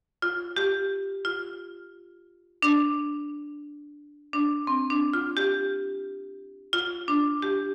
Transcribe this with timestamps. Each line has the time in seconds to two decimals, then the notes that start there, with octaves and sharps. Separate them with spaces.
0.22 F4
0.57 G4
1.25 F4
2.62 D4
4.33 D4
4.67 C4
4.90 D4
5.13 F4
5.37 G4
6.73 F4
7.08 D4
7.42 G4